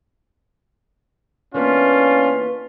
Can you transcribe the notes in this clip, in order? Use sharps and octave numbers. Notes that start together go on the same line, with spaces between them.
E3 A#3 B3 C#4 D4 F4